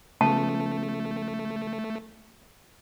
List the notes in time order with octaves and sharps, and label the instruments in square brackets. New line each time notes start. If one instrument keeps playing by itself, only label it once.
[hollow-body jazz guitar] C#3 F3 B3 [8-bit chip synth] A3 [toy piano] A5